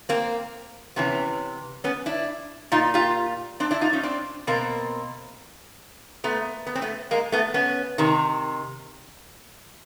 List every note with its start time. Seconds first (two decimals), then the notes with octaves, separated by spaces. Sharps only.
0.09 A#3 C4
0.96 C3 E3 B3 C#4
1.84 B3 C#4
2.06 D4 E4
2.72 A#2 D#4 F4
2.94 F4 G4
3.60 C4 D4
3.71 D4 E4
3.81 D#4 F4
3.93 C#4 D#4
4.03 C4 D4
4.47 B2 A#3 C4
6.24 A#2 A3 B3
6.67 B3
6.75 C4
6.82 A3 B3
7.11 G#3 A#3
7.32 A3 B3
7.54 B3 C#4
7.98 C3 D#3